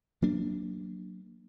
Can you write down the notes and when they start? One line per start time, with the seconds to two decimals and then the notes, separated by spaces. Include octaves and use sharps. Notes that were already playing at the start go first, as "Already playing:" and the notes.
0.22 F#3 A#3 D4